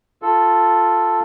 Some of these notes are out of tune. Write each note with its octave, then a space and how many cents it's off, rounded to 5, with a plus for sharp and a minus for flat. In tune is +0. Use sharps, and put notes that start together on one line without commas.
F4 +0 A4 +0